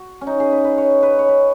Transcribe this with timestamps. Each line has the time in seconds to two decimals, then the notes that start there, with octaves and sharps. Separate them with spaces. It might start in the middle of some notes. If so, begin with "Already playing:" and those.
Already playing: F#4
0.21 C#4
0.27 D#4
0.40 G#4
0.52 B4
0.64 B4
0.78 C#5
1.03 B4
1.19 C#5
1.29 B4